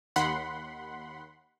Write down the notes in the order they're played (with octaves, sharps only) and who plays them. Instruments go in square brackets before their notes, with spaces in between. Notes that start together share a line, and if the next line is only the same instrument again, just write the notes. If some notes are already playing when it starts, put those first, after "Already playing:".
[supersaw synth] D#2 F#5 B5 C6